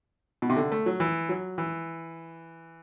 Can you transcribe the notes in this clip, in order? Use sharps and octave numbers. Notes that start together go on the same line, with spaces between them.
B2
C3
D3
A3
F#3
E3
F#3
E3